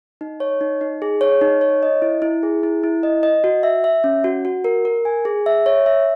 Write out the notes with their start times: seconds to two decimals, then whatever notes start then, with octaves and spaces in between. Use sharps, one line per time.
0.21 D#4
0.40 C#5
0.61 D#4
0.81 D#4
1.02 G#4
1.21 C#5
1.41 D#4
1.61 C#5
1.83 D#5
2.02 E4
2.22 E4
2.43 G#4
2.63 E4
2.83 E4
3.03 D#5
3.23 D#5
3.44 F#4
3.63 E5
3.84 E5
4.04 C#4
4.24 F#4
4.45 F#4
4.64 A#4
4.85 A#4
5.05 G#5
5.25 G#4
5.46 E5
5.66 C#5
5.86 E5